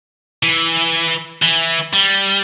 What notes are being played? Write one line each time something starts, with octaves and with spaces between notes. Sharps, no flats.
E3
E3
G3